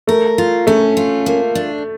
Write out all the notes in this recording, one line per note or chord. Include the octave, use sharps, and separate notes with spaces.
A3 A#4
F4
A3 C#4
F4
A#3
D4